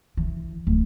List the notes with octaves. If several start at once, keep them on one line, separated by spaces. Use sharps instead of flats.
E3
D1